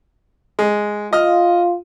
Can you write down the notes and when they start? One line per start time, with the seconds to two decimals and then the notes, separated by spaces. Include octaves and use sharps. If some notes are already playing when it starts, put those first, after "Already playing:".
0.59 G#3
1.13 F4 D#5 F6